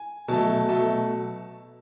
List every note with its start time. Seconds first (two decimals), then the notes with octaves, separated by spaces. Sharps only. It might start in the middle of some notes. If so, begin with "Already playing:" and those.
Already playing: G#5
0.28 B2 F#3 A3 A5
0.68 B2 F#3 A3 A5